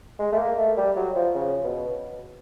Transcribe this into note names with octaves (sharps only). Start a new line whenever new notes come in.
G#3
A3
A#3
A3
G3
F#3
F3
C#3
B2